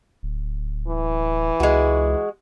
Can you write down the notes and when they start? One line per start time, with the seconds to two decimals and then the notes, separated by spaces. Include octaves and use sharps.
0.23 D1
0.88 E3
1.60 C#2 G#3 F#4